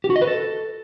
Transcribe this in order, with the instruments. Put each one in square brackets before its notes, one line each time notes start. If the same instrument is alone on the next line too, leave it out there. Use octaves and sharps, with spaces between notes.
[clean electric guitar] G4
F#4
D#5
B4
A4